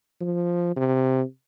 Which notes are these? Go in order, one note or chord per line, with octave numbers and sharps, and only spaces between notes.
F3
C3